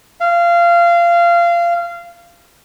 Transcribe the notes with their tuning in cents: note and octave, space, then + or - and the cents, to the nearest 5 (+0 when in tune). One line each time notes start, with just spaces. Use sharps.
F5 -20